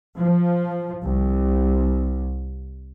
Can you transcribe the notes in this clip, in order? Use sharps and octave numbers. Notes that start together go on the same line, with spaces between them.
F3
C2